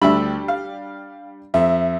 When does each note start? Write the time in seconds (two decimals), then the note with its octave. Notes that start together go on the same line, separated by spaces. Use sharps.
0.02 D2 G3 D4 G4 E5 B5
0.48 F5
1.54 F2 E5